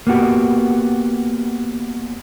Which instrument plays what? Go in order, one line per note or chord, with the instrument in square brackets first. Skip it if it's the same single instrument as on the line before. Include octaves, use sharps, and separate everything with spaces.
[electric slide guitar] A#3 B3 F#4 G4